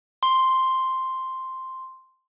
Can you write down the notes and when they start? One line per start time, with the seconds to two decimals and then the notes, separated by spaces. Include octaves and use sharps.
0.23 C6